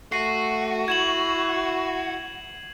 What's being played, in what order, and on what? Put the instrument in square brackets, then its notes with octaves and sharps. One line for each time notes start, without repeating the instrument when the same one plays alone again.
[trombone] A3 [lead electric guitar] F#4 [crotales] C7 D#7
[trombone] E4 [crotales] G#6 E7 F#7